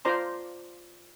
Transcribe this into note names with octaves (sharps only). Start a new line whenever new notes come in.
F4 C5 D5 A#5 C6